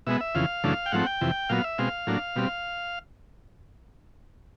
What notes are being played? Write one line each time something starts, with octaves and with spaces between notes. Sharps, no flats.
B2 G#3 B3 E5
E5
F2 C#3 E3 F5
F#2 C#3 E3 A3 D4
G5
G#2 F3 A3 C4 F#5
G5
F2 C3 E3
A#2 F#3 B3 F5
E5
B2 G#3 C4 F5
A2 F#3 A#3 D4
B2 G3 C4